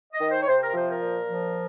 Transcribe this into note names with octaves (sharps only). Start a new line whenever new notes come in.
D#5
D#3
C5
C#5
C3 C5
A#4
F3 C5
A#4
A#2
F3